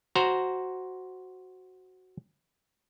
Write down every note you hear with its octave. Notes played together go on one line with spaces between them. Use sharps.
F#4 C5 A#5